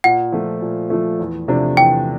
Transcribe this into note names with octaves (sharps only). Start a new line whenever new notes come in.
A#2 F#5
F3 A3
A#2
F3 A3
E2
C3 F3 A3 D4
E2 G5